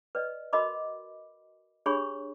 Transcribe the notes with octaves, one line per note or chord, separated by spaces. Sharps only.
B4 D5 D#5
F#4 A#4 D#5 B5 D6
D4 G4 G#4 C#5 B5 C#6